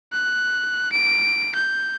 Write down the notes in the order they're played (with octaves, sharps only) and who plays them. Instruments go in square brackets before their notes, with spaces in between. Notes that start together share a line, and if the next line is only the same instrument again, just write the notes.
[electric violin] F#6
D7
G6